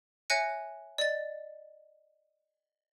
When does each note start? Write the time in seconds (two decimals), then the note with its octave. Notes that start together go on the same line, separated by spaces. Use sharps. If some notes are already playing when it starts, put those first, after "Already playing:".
0.30 C#5 E5 G#5 F#6 A#6 C#7
0.98 D5 D#5 A6